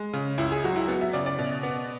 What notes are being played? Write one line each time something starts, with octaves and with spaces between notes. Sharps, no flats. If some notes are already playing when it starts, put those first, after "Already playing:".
Already playing: G#3
C#3
C#2 E4
G#4
F#3 F#4
E4
B3 F#4
E5
C#3 D5
D5
B2
B3